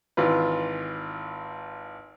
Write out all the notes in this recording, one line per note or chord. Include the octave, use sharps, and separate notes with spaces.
G#1 E3 F4 B4